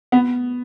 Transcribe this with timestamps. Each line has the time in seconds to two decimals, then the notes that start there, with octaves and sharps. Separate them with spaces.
0.12 B3